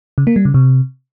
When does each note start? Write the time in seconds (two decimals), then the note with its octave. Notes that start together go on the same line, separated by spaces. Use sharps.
0.18 C#3
0.27 A#3
0.36 G3
0.45 C#3
0.54 C3